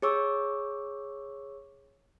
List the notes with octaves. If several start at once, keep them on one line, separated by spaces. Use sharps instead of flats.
G#4 C#5 C#6 D6 E6